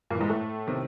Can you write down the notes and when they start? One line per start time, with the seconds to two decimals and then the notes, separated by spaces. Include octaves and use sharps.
0.10 G2 A#2 A#3
0.15 E3
0.20 G#2 G#3
0.30 A2 A3
0.67 C3 D#3